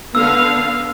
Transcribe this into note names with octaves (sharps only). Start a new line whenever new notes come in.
D3 B3 F5 E6